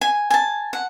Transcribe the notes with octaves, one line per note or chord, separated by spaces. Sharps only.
G#5
G#5 A5
F#5